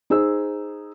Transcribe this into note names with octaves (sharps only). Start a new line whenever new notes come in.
D#4 G#4 C5 E6